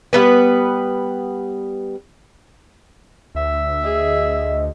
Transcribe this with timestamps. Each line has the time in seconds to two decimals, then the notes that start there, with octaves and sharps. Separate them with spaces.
0.13 G3 B3 B4
3.35 D2 E5
3.84 G#4 D#5